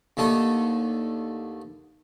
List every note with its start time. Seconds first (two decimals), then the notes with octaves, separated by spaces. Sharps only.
0.17 D#2 D3 A3 A4 D#6